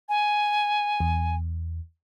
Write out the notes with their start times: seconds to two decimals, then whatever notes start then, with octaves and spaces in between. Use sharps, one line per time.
0.09 G#5
1.00 E2